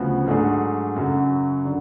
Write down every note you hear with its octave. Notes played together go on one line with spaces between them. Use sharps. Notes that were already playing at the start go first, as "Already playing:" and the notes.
Already playing: D2 C#3 F3 B3 F#4
G#2 F#3 A3 D4 G#4
F#2 C#3 F#3
D3